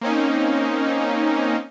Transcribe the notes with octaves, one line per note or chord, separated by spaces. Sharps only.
A#3 C4 C#4 D#4